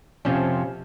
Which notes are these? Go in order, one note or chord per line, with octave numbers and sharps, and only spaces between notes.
F2 C3 F3 C#4